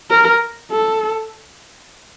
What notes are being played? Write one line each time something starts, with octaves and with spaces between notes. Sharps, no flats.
A#4
A4